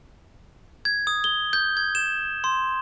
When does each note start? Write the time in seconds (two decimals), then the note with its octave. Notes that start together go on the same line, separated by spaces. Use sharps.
0.85 G#6
1.07 D#6
1.24 G7
1.53 G6
1.77 G#6
1.95 E7
2.44 C6